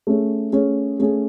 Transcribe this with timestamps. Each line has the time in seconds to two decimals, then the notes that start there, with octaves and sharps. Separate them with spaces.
0.07 A3 C#4 G#4
0.53 A3 C#4 G#4
0.99 A3 C#4 G#4